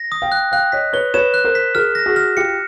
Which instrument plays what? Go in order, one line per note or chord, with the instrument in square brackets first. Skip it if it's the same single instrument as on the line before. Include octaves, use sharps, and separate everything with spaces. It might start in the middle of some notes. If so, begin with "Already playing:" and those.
Already playing: [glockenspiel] A#6
D#6
[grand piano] F5 G5
[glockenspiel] F#6
[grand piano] F5 G5 [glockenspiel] F#6
[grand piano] C#5 D#5 [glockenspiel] B6
[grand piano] B4 C#5 [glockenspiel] G7
[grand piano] B4 C#5 [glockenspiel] E7
[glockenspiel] F#6
[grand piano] A#4 C5
[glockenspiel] B6
[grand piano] G#4 A#4 [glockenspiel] F6
[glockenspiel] A#6
[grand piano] F#4 G#4
[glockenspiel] F6
[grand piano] F4 G4 [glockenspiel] C#7